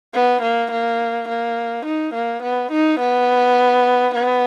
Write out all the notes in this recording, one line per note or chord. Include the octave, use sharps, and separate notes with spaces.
B3
A#3
A#3
A#3
D#4
A#3
B3
D#4
B3
B3